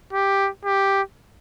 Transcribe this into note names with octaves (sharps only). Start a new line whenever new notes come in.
G4
G4